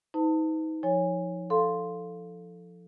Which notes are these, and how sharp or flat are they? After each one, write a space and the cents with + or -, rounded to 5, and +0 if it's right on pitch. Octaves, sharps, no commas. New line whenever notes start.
D#4 +30 B4 +45 A5 +25
F3 +0 C#5 +0 G#5 -20
A4 +0 F5 +0 C6 +0